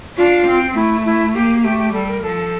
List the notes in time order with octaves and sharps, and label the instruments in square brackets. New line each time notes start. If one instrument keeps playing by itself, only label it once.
[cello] D4 [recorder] F4
[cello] C4
[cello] A3 [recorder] E4
[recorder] E4
[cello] A#3 [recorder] G4
[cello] A3 [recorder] G4
[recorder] G4
[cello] G3 [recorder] A4
[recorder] A#4
[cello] F3 [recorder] A4